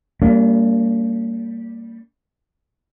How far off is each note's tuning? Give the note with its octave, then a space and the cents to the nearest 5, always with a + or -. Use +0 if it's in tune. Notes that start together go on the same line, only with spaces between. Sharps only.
G3 +0 A#3 -25 D4 -45